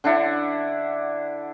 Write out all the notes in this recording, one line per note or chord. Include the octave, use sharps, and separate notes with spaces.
D3 D4 E4 F#5